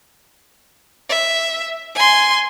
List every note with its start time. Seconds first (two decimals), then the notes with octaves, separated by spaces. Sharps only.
1.09 E5
1.95 G#5 C6